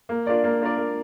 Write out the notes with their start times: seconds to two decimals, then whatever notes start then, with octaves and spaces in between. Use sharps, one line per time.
0.09 A#3
0.27 D4 F4 A#4 D5
0.44 A#3
0.62 D4 F4 A#4 D5
0.77 A#3